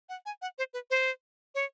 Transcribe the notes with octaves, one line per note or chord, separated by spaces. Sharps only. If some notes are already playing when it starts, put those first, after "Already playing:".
F#5
G#5
F#5
C5
B4
C5
C#5